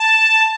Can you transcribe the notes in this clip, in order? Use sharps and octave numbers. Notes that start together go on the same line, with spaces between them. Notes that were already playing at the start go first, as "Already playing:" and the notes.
Already playing: A5